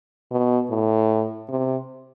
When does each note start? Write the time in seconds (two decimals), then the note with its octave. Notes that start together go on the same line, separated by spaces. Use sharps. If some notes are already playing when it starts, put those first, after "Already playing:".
0.32 B2
0.70 A2
1.49 C3